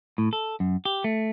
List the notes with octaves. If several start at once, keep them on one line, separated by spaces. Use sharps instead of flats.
A2
A4
F#2
G4
A3